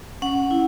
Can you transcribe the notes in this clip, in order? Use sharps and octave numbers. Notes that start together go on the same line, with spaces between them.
C#4 F#5
E4